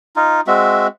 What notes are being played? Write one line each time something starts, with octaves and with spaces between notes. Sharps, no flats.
D#4 F4
G#3 C4 F#4 E5